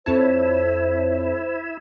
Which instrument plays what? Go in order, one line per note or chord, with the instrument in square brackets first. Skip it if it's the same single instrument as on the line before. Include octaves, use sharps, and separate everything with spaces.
[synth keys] F2 C#5 A5 [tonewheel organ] E4 [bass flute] C5